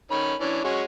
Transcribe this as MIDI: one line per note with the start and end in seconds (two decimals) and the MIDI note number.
0.11 0.34 51
0.11 0.34 61
0.11 0.34 83
0.41 0.64 52
0.41 0.64 61
0.41 0.64 62
0.64 0.82 56
0.64 0.82 61
0.64 0.82 66